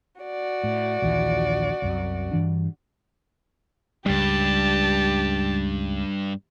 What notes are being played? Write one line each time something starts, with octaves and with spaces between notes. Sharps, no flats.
F#4 D5
A2
A#1 D#2 E3
C2 F#2
G2 E3 D4
C#2 G2 G3 G4 A5